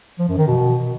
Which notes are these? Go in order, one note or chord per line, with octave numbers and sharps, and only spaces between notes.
F3
F#2
D#3
B2